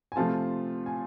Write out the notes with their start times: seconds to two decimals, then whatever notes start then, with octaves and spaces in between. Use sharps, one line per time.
0.12 G#5
0.16 C3 F3 A3 C4 F4 A5
0.86 G#5